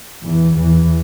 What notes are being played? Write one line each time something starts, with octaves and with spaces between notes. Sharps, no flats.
E2 E3
E2 E3